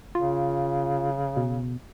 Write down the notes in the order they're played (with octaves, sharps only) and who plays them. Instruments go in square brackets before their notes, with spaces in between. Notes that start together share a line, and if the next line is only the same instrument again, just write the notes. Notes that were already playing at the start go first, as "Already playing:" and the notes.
[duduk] C#3 [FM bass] F4
[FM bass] B2